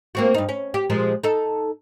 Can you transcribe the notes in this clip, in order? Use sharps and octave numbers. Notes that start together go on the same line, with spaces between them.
A#3 C4 F#4
G2 D#4
C#4
G4
A#2 F3 G#3
D#4 A4